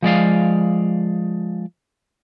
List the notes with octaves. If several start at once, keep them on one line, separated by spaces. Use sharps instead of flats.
F3 G#3 D5 F5